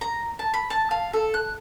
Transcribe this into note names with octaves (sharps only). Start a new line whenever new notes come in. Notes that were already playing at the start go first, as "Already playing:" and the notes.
A#5
A5
B5
A5
F5
A4
F#6